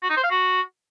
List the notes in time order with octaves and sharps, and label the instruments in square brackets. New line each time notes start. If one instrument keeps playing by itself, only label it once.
[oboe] F#4
D#4
C5
F5
F#4